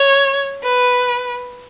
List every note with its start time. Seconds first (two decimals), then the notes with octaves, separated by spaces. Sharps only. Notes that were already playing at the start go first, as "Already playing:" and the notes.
Already playing: C#5
0.63 B4